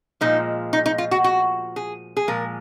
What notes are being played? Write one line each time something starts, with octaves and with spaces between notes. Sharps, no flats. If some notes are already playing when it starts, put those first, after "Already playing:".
A#2 F3 G#3 D#4
D#4
D#4
F4
F#4
F#4
G#4
G#4
A#2 F3 G#3 A#4